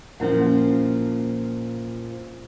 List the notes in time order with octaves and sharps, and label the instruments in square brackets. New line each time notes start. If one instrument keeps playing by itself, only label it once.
[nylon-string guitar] A#2 F3 [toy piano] C#4 E4 F#5